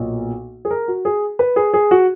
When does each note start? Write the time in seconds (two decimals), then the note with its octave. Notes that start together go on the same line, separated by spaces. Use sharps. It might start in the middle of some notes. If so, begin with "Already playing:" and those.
Already playing: B1 A#2
0.65 G#4
0.71 A#4
0.88 F#4
1.05 G#4
1.39 B4
1.56 G#4
1.74 G#4
1.91 F#4